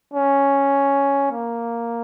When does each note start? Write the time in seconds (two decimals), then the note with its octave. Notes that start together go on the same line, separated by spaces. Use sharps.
0.14 C#4
1.32 A#3